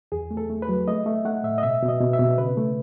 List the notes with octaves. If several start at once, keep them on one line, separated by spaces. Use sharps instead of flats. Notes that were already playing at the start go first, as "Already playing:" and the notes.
E2 G#4
A3
A4
A3
B4
F#3
A3 D#5
A3 E5
A3 F#5
A2 E5
D#5
B2 E5
B2
D#5
B2
E5
B2
C#3 B4
A3